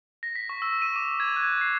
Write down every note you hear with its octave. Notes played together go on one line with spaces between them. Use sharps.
A#6
B6
C#6
E6
D#7
D6
G#6
F#6
C7